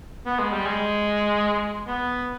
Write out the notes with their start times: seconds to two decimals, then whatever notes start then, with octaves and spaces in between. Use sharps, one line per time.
0.26 B3
0.39 G#3
0.53 G3
0.67 G#3
1.87 B3